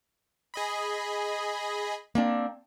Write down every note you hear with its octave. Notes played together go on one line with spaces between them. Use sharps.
G#4 D#5 B5
A#3 C4 D4